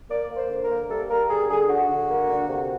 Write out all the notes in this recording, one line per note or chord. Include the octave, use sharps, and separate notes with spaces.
A#3 D5
A#3
C5
D3
A#4
A#3
G3 A4
G3 A#4
D3 G#4
D3 G#4
D3 F#4
D3
A#3
D3
C3